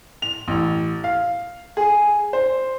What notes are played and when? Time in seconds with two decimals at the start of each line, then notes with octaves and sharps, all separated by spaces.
0.22 F7
0.48 A1
1.04 F5
1.77 G#4
2.33 C5